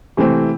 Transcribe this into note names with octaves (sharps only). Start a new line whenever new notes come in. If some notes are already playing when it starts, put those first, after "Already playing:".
C3 E3 A3 C4